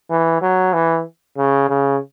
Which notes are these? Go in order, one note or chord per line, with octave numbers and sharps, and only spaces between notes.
E3
F#3
E3
C#3
C#3